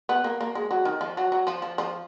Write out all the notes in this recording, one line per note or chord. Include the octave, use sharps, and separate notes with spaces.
B3
A#3
A#3
G#3
F#3
D#3
F3
F#3
F#3
F3
F3
F3